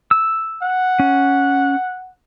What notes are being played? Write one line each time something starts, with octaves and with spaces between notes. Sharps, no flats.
E6
F#5
C#4